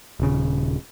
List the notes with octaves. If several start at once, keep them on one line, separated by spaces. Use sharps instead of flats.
D#1 C#3